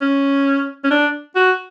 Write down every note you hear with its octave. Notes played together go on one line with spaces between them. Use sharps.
C#4
C#4
D4
F#4